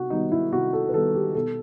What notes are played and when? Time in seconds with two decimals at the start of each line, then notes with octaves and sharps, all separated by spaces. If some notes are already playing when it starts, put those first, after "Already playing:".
Already playing: C3 F#4
0.10 D#3 G3 B3 D#4
0.32 E4
0.52 C3 F#4
0.73 A4
0.89 B4
0.93 D#3 G3 B3 A4
1.15 G4
1.35 B2 A4